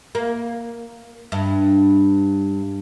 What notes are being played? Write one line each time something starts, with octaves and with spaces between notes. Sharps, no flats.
A#3
G2